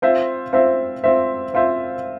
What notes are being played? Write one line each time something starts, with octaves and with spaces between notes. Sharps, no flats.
C4 F4 C5 E5
C4 F4 C5 E5
C4 F4 C5 E5
C4 F4 C5 E5